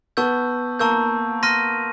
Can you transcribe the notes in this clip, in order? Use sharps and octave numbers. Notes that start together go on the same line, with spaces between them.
B3 A5 C#6 E6 G6
A#3 A5 C#6 E6 G6
C6 F6 A#6 D#7